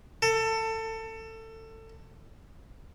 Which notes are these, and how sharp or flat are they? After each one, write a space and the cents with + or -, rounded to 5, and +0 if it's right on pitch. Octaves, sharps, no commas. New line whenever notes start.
A4 +25